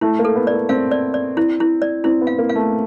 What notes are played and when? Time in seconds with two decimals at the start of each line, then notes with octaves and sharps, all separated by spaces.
0.01 A3 E4
0.19 A#3
0.25 A4
0.36 B3
0.47 D5
0.52 A#3
0.69 C4 F5
0.91 D5
1.14 D5
1.37 E4
1.60 E4
1.82 D5
2.04 C4 E4
2.21 B3
2.27 F5
2.39 A#3
2.49 F5
2.55 A3